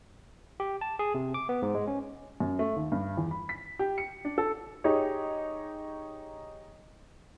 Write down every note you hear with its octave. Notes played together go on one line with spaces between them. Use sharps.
G4
A5
G#4
C3
D6
B3
G#2
G#3
C#4
F#2
A3
D#2
G2
E2
B5
B6
G4
C#7
D4
A4
D#4 G4 G#4 C#5